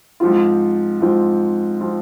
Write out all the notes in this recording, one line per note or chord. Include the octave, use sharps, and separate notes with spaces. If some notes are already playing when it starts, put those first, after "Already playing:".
G#2 F3 C4 F4
G#2 F3 C4 F4
F3 C4 F4